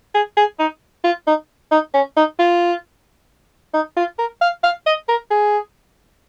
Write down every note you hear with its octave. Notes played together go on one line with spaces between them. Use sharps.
G#4
G#4
D#4
F4
D#4
D#4
C#4
D#4
F4
D#4
F4
A#4
F5
F5
D#5
A#4
G#4